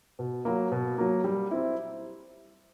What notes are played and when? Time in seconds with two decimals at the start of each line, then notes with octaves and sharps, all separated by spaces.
0.19 B2
0.45 F#3 A#3
0.72 B2
0.98 F#3 A#3
1.24 G3
1.51 C4 E4